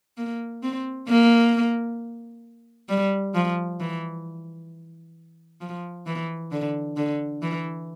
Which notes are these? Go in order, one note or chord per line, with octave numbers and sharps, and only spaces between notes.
A#3
C4
A#3
G3
F3
E3
F3
E3
D3
D3
E3